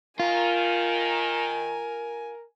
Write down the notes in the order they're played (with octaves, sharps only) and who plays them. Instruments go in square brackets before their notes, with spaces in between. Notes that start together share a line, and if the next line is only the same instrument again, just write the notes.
[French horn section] D#3 [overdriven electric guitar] F4 [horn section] A#4 [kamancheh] G#5